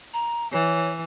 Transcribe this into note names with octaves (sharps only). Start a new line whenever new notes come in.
A#5
E3 C#5